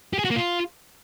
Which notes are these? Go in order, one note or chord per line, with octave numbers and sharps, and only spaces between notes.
G4
G#4
F#4
A#3
F4